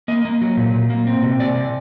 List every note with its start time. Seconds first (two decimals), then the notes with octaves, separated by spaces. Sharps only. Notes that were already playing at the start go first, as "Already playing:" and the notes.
0.08 A#3 D#5
0.25 A#3
0.41 F#3
0.57 A#2
0.74 A#2
0.90 A#3
1.07 C4
1.23 C3
1.40 C3 D5
1.55 C3